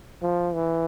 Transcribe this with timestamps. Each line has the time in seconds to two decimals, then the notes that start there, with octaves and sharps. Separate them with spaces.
0.22 F3
0.54 E3